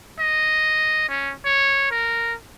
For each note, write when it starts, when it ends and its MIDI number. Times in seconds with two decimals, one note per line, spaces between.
0.19 1.06 75
1.09 1.33 61
1.45 1.91 73
1.91 2.34 70